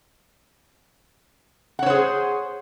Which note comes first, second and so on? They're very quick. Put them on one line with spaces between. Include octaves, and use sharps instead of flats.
F#5 C#5 C5 G#4